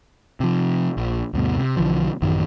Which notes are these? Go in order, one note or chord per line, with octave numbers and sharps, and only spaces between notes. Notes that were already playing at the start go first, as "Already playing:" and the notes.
C3 F3
A#1
D2 G2 B2
C3
B1 D3 E3 F3
A1 F#2 D#3